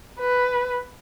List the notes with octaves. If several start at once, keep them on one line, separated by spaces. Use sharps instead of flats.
B4